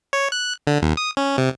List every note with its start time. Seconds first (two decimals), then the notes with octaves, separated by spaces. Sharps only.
0.13 C#5
0.32 F#6
0.67 D3
0.82 D#2
0.97 D#6
1.17 C#4
1.38 C3